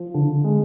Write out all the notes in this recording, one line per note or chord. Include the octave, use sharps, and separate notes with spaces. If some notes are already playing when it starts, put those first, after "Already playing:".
Already playing: F3
D3
G#3